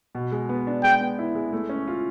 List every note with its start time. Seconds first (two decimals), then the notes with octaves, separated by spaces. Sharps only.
0.15 B2
0.32 G#3
0.49 B3
0.67 D4
0.83 G#3 G5
1.01 B3
1.19 E4
1.35 G#3
1.53 A3
1.69 C#4
1.88 F4